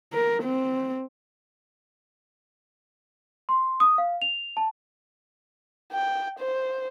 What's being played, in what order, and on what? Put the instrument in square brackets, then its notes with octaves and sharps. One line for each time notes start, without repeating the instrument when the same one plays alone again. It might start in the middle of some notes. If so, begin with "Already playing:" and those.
[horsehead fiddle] A#4
C4
[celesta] C6
D#6
F5
F7
A5
[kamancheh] G5
C5